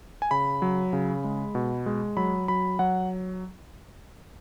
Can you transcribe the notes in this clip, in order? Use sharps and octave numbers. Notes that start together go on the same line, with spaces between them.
G#5
C#3 B5
F#3
C#3
G#3
B2
G#3
F#3 B5
F#3 B5
F#3 F#5